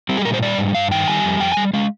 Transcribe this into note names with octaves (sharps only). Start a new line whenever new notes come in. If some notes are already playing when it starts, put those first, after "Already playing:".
G3 C4
G#4
A#2 A#4
C5
G3 D5
G#2
G2 F5
D#3 G5
G3 G#5
F2
F2 G5
G#5
G3
G#3 F5